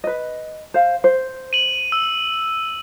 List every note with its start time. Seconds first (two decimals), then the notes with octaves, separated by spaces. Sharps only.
0.04 B4 D#5
0.74 C5 F5
1.04 C5
1.53 D#7 F#7
1.92 E6